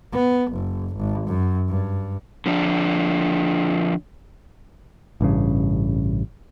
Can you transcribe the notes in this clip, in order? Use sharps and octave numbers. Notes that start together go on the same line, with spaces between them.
B3
F#1
G#1
F#2
G2
D3 F3 D4
A1 G2 C#3